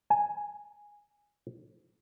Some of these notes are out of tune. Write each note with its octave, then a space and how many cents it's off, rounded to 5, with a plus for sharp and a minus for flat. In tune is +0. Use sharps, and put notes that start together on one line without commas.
G#5 -5